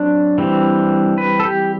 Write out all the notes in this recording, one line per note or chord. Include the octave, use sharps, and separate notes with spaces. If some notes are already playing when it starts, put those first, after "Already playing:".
Already playing: F#3 C4 D4
E3 G3 C4
B4
A4
G4